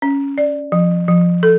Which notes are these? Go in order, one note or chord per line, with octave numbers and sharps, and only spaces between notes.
C#4
D5
F3
F3
A4